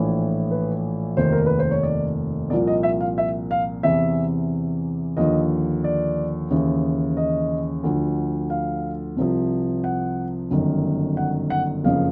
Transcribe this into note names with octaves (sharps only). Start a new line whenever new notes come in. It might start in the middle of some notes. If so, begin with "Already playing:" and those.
Already playing: A#1 A2 E3
B4
F1 D#2 D#3 C5
A#4
B4
C5
C#5
D5
C2 A#2 F3 D5
D#5
E5
F5
E5
F5
E2 C3 E3 E5
D#2 D3 F3 D#5
D5
D#2 C#3 E3
D#5
D2 D3 F3
F5
C2 C3 F3
F#5
G1 F#2 D#3
F#5
F#5
F#1 F2 C#3 F5